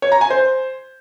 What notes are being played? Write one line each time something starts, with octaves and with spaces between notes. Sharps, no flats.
C#5
A#5
G#5
C5